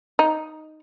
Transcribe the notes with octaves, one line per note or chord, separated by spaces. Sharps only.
D#4